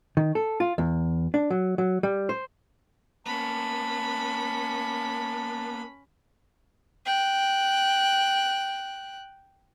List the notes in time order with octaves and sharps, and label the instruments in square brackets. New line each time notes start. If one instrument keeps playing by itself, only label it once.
[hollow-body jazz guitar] D#3
A4
F4
E2
D4
F#3
F#3
G3
C5
[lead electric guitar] A#3 B3 [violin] C#4 B5 [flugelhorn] A5
[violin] G5 F#6